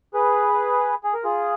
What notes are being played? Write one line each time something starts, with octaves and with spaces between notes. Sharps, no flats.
G#4 B4
G#4
A#4
F4 G#4